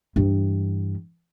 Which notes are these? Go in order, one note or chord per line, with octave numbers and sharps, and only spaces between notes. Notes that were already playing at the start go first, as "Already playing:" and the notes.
G2 E3